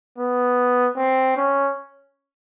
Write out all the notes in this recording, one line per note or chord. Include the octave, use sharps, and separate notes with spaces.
B3
C4
C#4